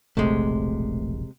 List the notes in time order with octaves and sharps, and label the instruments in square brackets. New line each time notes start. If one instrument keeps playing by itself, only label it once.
[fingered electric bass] E1 A#1 [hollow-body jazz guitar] C3 G#3 [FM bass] A3